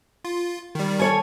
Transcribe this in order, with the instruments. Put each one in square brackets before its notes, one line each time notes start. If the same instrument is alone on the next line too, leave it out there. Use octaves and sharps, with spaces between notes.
[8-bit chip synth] F4
D#3 G3
[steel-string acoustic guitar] A4 C#5 G#5